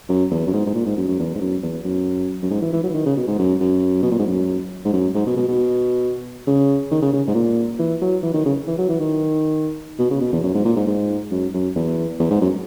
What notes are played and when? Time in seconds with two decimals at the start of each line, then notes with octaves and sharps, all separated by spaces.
0.09 F#2
0.31 E2
0.47 F#2
0.53 G#2
0.66 G#2
0.74 A#2
0.86 G#2
0.97 F#2
1.08 F#2
1.19 E2
1.35 G#2
1.41 F#2
1.63 E2
1.84 F#2
2.43 F#2
2.51 G#2
2.61 E3
2.73 E3
2.83 F#3
2.90 E3
2.94 D#3
3.06 C#3
3.17 B2
3.27 G#2
3.39 F#2
3.60 F#2
4.02 B2
4.11 A#2
4.19 G#2
4.27 F#2
4.85 G#2
4.93 F#2
5.15 G#2
5.26 B2
5.36 B2
5.48 B2
6.47 C#3
6.91 D#3
7.02 C#3
7.13 C#3
7.27 G#2
7.35 A#2
7.79 E3
8.02 F#3
8.23 E3
8.34 D#3
8.46 C#3
8.67 E3
8.78 F#3
8.89 E3
9.00 D#3
9.99 B2
10.10 C#3
10.21 B2
10.33 E2
10.43 F#2
10.54 G#2
10.65 A#2
10.76 G#2
10.87 G#2
11.31 F#2
11.54 F#2
11.76 E2
12.19 E2
12.31 G#2
12.41 F#2